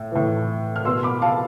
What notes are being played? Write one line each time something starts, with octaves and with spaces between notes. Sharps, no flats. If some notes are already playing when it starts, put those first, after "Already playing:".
Already playing: A2
A2 E3
F6
B2 C6 E6
B5 D6
F5 A5